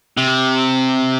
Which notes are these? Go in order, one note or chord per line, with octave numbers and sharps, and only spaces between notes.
C3